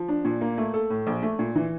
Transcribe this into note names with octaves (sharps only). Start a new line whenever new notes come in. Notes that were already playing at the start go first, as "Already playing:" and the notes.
Already playing: F3
D4
A#2
A#3
A3
A4
A2
A#1
A3
A#2
E3